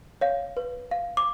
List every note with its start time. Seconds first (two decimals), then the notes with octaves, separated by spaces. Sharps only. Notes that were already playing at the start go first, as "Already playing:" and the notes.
0.21 C#5 F5
0.57 B4
0.91 F5
1.17 D6